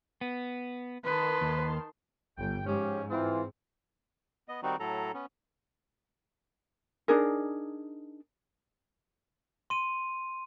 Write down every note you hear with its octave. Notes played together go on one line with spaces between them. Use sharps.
B3
D#3 B4 A5 C6
D#2
G1 G5
G#2 F3 C#4 G4
E3 C4 F4
B3 D#5
D#3 G3 C4 D#4 F#4
A2 F#3 A4 A#5
B3 C#4
D4 D#4 G#4 A#4
C6 D#7